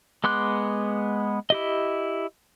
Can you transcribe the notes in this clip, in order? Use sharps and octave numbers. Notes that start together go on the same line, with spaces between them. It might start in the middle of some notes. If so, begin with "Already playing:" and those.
G#3 B3 C6 D6 F#6
E4 G4 D#5